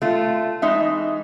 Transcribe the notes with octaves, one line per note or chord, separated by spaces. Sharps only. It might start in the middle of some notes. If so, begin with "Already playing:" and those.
A3 F4
E3 G#3 D#4 E5